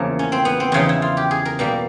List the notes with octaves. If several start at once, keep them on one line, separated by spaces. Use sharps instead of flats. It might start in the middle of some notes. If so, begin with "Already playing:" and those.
Already playing: E2 C#3 F3 A#3
C#4
C4
B3
C4
E2 C#3 F3 D#4
E4
F4
G4
G#4
A#4
B2 G3 A#3